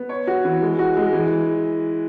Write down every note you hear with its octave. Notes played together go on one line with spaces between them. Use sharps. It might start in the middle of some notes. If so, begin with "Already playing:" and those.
Already playing: B3
C#5
F#4
E3
G#3
F#4
G#3
E3